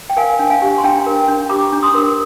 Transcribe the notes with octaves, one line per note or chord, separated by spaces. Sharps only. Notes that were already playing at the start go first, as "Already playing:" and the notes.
G5
A#4 F5 G#5
D4
F5 G#5
G4
C6
D4 G5 A#5
A#4
D4
G4 A#5 D6
D4
C6 D#6
A#4